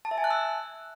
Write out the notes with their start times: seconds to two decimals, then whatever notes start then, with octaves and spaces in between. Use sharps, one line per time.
0.05 A5
0.11 E5
0.18 G#5
0.24 F#6
0.30 E6